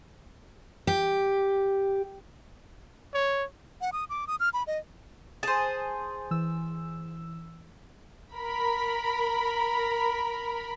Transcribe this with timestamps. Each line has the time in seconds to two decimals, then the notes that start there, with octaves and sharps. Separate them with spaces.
0.87 G4
3.14 C#5
3.81 F#5
3.93 D#6
4.10 D6
4.27 D#6
4.40 F6
4.54 B5
4.67 D#5
5.43 G#4 C5 A5
6.31 E3 E6
8.34 A#4 B5